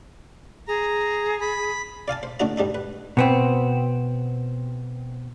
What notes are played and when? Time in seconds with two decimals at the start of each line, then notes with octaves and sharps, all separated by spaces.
0.68 G#4 A#5
1.41 B5
2.08 D5 F5 G#5 A5
2.23 C5
2.40 A2 D3 D4 F#4 D#5 A#5
2.58 G#2 G3 D4 D#4
2.75 B4
3.17 B2 B3 C4